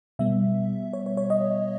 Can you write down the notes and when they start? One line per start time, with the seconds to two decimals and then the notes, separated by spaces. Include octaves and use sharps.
0.19 B2 G3 B3 E5
0.93 C#5
1.06 C#5
1.17 C#5
1.30 D#5